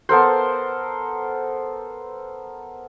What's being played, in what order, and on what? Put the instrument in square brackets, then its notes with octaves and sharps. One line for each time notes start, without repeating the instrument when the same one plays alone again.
[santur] B3 A4 A#4 C5